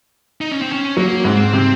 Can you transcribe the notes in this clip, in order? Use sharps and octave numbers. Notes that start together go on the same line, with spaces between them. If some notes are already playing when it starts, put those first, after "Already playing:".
D#4
C#4
C4
C#4
F#3 A#3
G#2 C4
C3